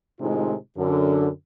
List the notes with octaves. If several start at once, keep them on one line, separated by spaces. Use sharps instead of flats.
A2 C3 D#3 G#3 D#4 F4
F#2 D3